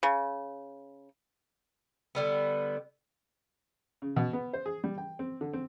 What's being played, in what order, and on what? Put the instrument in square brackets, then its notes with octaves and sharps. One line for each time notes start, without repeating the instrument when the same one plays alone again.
[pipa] C#3
[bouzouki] D3 G3 B3
[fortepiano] C#3
B2
B3
C5
G#4
G3
G5
C4
D3
C4